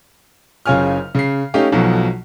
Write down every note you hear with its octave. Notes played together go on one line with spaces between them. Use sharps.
F#1 C#3 F4 C#5 G#5 F6
C#3 C7
A3 C#4 D#4 G4 F5
B1 B2 F3 F#3 A3